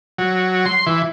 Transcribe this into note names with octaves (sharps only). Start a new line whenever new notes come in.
F#3
C6
E3